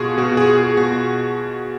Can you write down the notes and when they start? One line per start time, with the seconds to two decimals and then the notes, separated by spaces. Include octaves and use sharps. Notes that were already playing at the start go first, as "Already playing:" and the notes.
Already playing: B2 F4 F#4 G#4
0.18 B2 F#4
0.37 G#4
0.58 G#4
0.77 B2 F#4